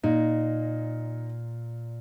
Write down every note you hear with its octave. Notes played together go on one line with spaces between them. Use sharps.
A#2 D#4